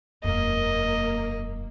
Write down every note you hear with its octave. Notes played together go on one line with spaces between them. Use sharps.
E1 F#2 A#3 D#5